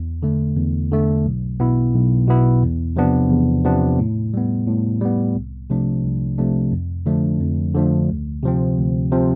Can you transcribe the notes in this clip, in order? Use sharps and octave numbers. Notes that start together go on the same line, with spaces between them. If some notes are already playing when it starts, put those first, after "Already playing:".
Already playing: E2
D3 A3
E2
D3 A3
B1
B2 B3 E4
B1
B2 B3 E4
E2
C3 F3 B3 D4
E2
C3 F3 B3 D4
A2
G3 B3
A2
G3 B3
C2
C3 F3 A3 D4
C2
C3 F3 A3 D4
F2
D3 F3 A3 D4
F2
D3 F3 A3 D4
D2
C3 F3 C4
D2
C3 F3 C4